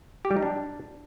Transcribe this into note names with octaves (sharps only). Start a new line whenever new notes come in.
G4
G3
D#4
D4